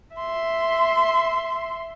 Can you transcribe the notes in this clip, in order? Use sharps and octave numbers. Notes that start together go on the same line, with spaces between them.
E5 C6